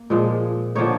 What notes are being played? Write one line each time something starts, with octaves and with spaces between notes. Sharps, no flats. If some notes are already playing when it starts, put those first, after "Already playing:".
Already playing: A#3
A#2 F3 G#3
D3 F3 A#3 D#4 C#5